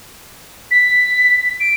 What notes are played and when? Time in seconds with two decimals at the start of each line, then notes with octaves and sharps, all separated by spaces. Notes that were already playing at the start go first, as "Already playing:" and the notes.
0.71 B6
1.60 D7